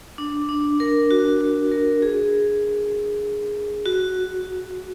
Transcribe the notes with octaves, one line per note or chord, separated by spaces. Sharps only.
D4
D4
A#4
F#4
F#4
A#4
G#4
F#4